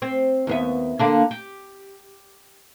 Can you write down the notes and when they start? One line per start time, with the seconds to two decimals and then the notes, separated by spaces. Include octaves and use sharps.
0.02 C4
0.47 D#2 B3 E5
0.99 D3 A#3 D4
1.31 G4